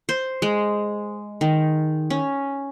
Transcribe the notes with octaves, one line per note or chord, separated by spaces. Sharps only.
C5
G#3
D#3
C#4